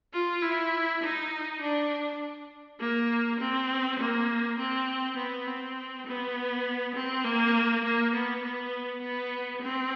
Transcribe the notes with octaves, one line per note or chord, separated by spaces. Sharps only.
F4
E4
D#4
D4
A#3
C4
A#3
C4
B3
C4
B3
C4
A#3
A#3
B3
B3
B3
C4